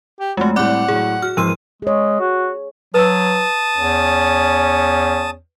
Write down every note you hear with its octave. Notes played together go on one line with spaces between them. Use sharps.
G4
F2 G#3 A3 F#4
A2 G3 C4 D5 F#5 D6 F#6
A2 F#3 G#4
F#4 F6
G#1 E3 F3 C6 E6 D#7
G#3 G#4 C#5
F#4
F#3 B4 A5 D#6 E6
E2 C#4